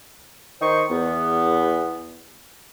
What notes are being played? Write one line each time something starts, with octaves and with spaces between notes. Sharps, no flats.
D#3 D#4 C5 C#6
E2 B3